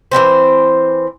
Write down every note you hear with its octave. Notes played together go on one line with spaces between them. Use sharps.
E3 F#3 C4 C5